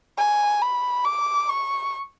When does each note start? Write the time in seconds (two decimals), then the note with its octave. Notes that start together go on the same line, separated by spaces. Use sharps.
0.18 G#5
0.61 B5
1.04 D6
1.49 C#6